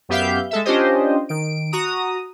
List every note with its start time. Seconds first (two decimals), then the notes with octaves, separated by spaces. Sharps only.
0.09 F#2 B3 G4 E5 F5 G6
0.51 G#3 A4 E5
0.65 C#4 D4 F4 G4 C5 D#5
1.29 D#3 D7
1.72 F#4 A#5 D#6